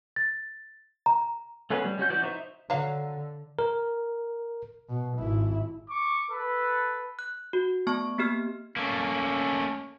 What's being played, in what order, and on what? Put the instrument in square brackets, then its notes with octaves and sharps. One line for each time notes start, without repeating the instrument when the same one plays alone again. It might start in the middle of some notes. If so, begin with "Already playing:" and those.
[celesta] A6
A#5
[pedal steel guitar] A3 B3 C#4 G#4 B4
G3
G#3 C#4 F#4 G6
E3 C#4 F#4 D5 G6
D#4 C5 E5
[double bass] D3 [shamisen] F#3 F5
[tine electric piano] A#4
[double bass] B2
G#1 E4
[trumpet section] C#6 D6
A4 B4
[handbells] F#6
F#4
A3 B3 A5 C#6
A#3 B3 G4 F6
[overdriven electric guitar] A3 A#3 [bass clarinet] C#4